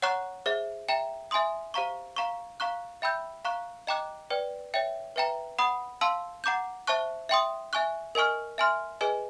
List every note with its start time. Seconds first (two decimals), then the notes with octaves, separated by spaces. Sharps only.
0.02 C#5 F#5 A#5 C#6 F#6
0.46 G#4 C5 E5
0.88 E5 G5 A#5
1.31 E5 G#5 C6 D#6
1.74 G4 C5 F5 A#5 C#6
2.16 F5 A#5 C#6
2.60 F5 A#5 C#6 F#6
3.02 E5 G5 B5 E6 G6
3.45 F5 A#5 C#6 F#6
3.87 D#5 G5 A#5 D6 F#6
4.30 B4 D5 G5
4.74 C#5 E5 G5
5.16 B4 E5 G5 A#5
5.59 F#5 B5 D#6
6.01 F5 A5 C6 E6
6.44 F#5 A#5 D6 G6
6.87 C5 E5 A5 C#6 F#6
7.29 E5 G5 C6 D#6
7.73 E5 G#5 C#6 F#6
8.15 A#4 D#5 G#5 C#6 F6
8.58 E5 G#5 C6 F6
9.01 G#4 B4 D#5 G#5